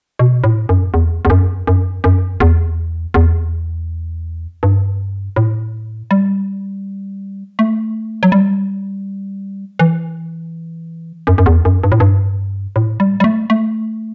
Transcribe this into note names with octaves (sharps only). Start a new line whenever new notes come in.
B2
A2
F#2
E2
E2
F#2
F#2
F#2
E2
E2
G2
A2
G3
A3
F#3
G3
E3
F#2
F#2
E2
F#2
G2
A2
G2
A2
G3
G3
A3
A3